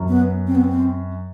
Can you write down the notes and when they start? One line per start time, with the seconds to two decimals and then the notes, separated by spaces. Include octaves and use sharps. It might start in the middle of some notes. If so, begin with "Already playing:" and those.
Already playing: F#2
0.08 B3
0.47 C4
0.55 B3
0.64 C4